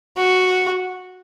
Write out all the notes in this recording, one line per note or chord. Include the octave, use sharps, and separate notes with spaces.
F#4